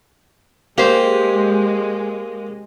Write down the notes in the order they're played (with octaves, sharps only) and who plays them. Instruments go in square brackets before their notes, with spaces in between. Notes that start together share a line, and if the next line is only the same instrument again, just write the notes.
[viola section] G#3 [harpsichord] A#3 [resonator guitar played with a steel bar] G4 C5